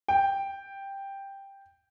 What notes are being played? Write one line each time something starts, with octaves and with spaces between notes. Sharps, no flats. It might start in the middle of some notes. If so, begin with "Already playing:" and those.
G5